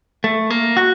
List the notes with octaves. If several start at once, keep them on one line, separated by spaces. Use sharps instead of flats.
A3
A#3
F#4